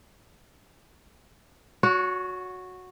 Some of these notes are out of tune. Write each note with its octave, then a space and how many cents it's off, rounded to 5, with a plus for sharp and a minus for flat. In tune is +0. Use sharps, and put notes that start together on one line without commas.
F#4 -10 C#5 +30